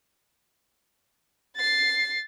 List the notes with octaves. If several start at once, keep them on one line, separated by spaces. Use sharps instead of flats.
A6 C7